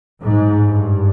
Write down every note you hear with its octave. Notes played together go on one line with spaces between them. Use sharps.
G#2
G2